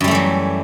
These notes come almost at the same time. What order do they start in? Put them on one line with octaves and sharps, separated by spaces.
F#2 G3 A3 E3 F#3